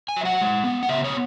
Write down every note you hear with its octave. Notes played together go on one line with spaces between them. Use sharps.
G#5
F#3 E5
F#5
G#3
B3
F#5
C#3 E5
C#5